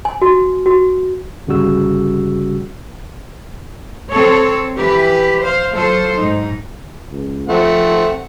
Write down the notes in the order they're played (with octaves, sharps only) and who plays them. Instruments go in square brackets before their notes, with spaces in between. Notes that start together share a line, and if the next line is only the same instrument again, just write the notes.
[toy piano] G#5
F#4
F#4
[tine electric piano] G1 C#3 G3 F#4 E6
[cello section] C4 A4 C#5
E3 G4 B4
C5 F5
F#3 F4 A4 C5
G#2 D#4
[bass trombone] C#2
[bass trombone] F3 [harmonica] A3 C4 F#5